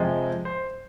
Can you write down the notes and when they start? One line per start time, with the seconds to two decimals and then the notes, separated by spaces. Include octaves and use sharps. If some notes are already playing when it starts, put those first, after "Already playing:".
Already playing: F2 C3 F3 G#3
0.45 C5